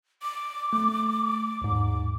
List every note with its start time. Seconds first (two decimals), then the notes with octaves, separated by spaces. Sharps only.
0.22 D6
0.73 A3
1.62 D#2 G#2